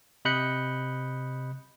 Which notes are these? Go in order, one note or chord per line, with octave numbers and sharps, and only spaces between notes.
C3 D#5 B5 F#6 G6 C#7